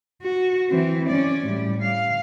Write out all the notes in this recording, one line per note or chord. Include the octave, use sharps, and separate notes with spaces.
F#4
E3 C4
C#4 D5
A2 G3
F5